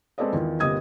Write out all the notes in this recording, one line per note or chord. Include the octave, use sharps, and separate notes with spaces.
G#3 C4 A4 B4 D5 D#5
E2 D#3 F4
G1 C3 A#3 D#5 D#6 G#6